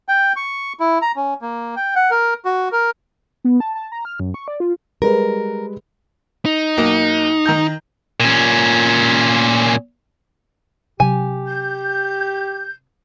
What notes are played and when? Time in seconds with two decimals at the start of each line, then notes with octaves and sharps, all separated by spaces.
0.09 G5
0.36 C#6
0.80 E4
1.02 A#5
1.16 C#4
1.42 A#3
1.76 G5
1.96 F#5
2.11 A#4
2.45 F#4
2.72 A#4
3.44 B3
3.60 A5
3.75 A5
3.92 A#5
4.05 F6
4.20 F#2
4.34 C#6
4.48 D5
4.60 F4
5.02 G3 G#3 A#4 B4
6.45 D#4
6.77 B1 A#3
7.46 D#3 A#5 G6
8.20 A#2 C#4
11.00 C3 F#3 G4 G#5
11.46 G6